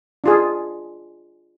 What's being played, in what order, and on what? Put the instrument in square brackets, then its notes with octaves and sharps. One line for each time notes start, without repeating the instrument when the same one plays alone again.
[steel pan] D4 F4 G#4